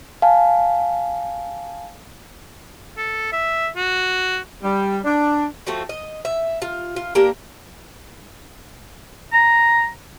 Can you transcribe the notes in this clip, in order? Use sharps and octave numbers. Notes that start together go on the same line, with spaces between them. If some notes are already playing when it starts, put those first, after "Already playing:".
F5 G#5 A5
A4
E5
F#4
G3
D4
F3 A3 C4 F#4
D#5
E5
F4
F4
A#3 D4 G4 A#4
A#5